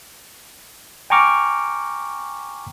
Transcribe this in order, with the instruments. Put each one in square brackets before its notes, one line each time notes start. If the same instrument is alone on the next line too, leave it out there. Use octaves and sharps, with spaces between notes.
[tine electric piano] G5 G#5 A#5 C#6 D6 F6